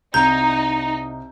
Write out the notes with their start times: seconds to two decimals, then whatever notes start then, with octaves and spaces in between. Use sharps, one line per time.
0.14 C2 D#4 A#5 G6